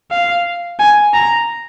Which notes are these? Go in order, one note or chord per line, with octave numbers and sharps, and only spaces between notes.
F5
G#5
A#5